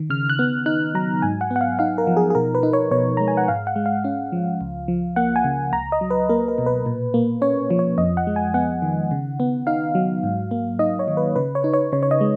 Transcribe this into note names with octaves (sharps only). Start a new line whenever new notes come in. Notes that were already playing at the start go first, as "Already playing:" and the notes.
Already playing: D#3
C#3 F6
F#6
B3
D#4 F#6
F#3 A#5
G#2 G#5
F#5
B3
F#5
F5
D#4 F5
A#4
F3
G#4
G#4
B2 A#4
B4
D#4
C#5
B2 C#5
G#3 A#5
G#5
F#5
G#2 F5
F#5
G#3
F5
C#4
F3
C#2
F3
A#3 F#5
G#5
C#3
C#2 A#5
D#5
F#3
B4
A#3 A#4
A#4
B2
B4
A#2
A#3
C#4 C#5
F3
C#5
F2 D#5
F#5
G#3
G#5
B3 F#5
D#3
C#3
B3
D#4 F5
F#3
G#2
A#3
D#4 D#5
C#5
D#3
B4
C#3 B4
C#5
D#4
C#5
C#3 C#5
C#5
D#5
G#3